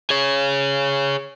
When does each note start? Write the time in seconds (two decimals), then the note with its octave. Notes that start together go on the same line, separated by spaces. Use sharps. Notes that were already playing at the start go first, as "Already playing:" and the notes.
0.10 G#4 C#5